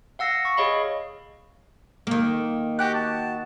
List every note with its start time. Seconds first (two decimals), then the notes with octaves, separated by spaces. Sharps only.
0.19 F5 F#5 E6 A#6 C7
0.45 C#6
0.57 G#4 C#5 D#5 F5 B5
2.07 D#3 A#3
2.79 F#4 G4 G5 F#6
2.93 A5